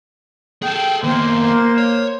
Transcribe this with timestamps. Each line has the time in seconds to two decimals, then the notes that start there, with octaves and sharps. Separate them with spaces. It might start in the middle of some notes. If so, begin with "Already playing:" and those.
0.62 G#4 A4 G5
1.03 D#3 A#3 B3 C5
1.41 C5
1.78 C#5